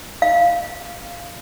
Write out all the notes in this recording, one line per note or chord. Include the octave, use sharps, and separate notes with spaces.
F5